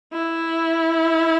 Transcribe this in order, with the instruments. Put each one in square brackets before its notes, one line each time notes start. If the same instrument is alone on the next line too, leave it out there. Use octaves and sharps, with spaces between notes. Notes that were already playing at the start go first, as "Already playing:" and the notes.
[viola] E4